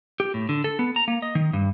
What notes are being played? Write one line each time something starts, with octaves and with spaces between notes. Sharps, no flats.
G4
A2
D3
A4
B3
A#5
A#3
D#5
D#3
G2